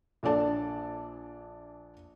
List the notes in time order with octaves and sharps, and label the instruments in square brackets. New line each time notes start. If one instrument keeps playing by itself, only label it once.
[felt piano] A#1 D4 A4 D5 A5